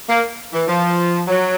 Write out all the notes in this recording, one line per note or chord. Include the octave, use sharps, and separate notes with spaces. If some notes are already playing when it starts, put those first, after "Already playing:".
A#3
E3
F3
F#3